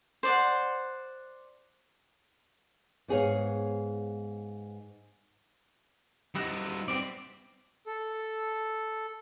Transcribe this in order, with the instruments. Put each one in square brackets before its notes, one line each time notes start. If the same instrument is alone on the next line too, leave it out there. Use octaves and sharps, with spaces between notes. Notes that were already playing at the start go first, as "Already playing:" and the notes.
[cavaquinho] C5 D5 F#5
[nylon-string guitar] G#2 B3 G#4 A4 C#5 F5
[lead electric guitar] G3 D#4 [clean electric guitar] B3 E4 F#4
[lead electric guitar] B3 C4 [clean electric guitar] G4 D5
[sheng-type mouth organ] A4